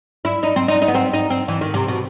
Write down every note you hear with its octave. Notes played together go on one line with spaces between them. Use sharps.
E4
D#4
C4
D#4
D#4
B3
C4
D#4
C4
E3
D#3
C3
B2